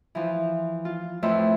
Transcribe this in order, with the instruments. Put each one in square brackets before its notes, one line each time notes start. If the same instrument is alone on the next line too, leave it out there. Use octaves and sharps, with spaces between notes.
[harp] E3 F3
F4
F2 A2 B4 E5 C6